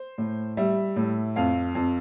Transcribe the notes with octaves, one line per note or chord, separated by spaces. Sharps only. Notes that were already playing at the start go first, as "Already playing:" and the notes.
Already playing: C5
A2
G3 E5
A2
F2 F5
F2